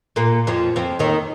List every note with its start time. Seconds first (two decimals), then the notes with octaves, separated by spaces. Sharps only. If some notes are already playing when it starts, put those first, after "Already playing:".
0.16 A#2 A#3
0.47 F2 F3
0.76 F2 F3
0.99 D#2 D#3